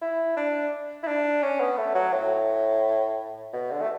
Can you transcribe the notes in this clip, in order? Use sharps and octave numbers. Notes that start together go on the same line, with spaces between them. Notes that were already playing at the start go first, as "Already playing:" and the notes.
E4
D4
E4
D4
C#4
B3
A3
F#3
A2
B2
D3
A3